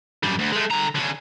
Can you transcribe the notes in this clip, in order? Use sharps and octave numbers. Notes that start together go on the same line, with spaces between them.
F#2 G3
D2
G#3 A3
D3 A#5
D3 C#4